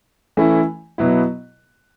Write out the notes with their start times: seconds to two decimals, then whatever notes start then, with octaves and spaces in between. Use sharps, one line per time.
0.37 E3 A3 C#4 E4
0.98 B2 F#3 B3 E4